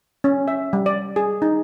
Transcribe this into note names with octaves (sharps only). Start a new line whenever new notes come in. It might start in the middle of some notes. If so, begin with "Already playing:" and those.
C#4
E5
G3
D5
G#4
D#4